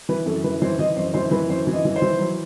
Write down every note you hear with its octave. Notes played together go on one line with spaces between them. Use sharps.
E3 B4
F#2 A4
E3 B4
E3 C5
E3 D#5
F#2 C5
E3 C5
E3 B4
F#2 C5
E3
D#5
E3
C5
E3
F#3